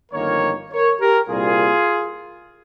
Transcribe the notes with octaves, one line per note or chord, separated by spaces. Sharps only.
G1 F2 D#3 A#3 A#4 C#5
A#4 C#5
G4 A#4
C2 A#2 G3 A#3 F4 G#4